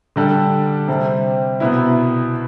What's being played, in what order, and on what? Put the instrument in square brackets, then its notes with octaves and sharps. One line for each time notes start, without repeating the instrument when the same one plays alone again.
[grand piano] D3 G3 D4 A4
C3 G3 C4
C2 B2 B3 E4